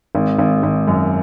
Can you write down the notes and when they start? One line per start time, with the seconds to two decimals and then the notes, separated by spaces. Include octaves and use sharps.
0.15 G#1
0.38 G#1
0.63 G#1
0.88 F#2